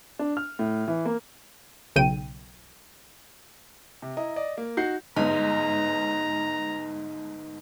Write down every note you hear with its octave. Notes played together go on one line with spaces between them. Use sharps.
D4
F6
A2
E3
A#3
B1 C#3 G5 D#7
C3
E4 D#5 A#5
D5 D#5
A#3
D#4 F#4 F#5 G6 C7
G1 G#2 D#4 A#5